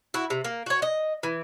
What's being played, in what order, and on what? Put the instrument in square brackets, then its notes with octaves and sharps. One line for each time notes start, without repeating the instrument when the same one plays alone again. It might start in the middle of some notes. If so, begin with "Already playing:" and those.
[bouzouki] E4 F#4
C3
A#3
F#4 C#5
D#5
E3